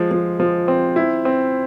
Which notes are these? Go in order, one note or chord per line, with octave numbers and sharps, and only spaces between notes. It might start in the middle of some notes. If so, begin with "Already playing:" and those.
Already playing: F3 G#3
F3
F3
C4
E4
C4